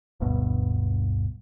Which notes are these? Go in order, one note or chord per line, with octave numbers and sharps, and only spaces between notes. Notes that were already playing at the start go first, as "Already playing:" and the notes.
D1 G1 G2 B2